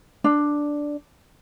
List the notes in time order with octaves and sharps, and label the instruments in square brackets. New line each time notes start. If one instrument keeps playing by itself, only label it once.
[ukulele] D4